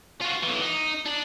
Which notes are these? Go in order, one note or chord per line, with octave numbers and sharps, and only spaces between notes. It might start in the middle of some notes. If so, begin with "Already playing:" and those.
F4 F#4
B1 E3
D#4
D4 D5